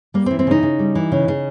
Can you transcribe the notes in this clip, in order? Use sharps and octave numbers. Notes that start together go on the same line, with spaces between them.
G3 A#3
C4
E3
C4
C#3 D#4
C#3
G3
E3
C#3
C#3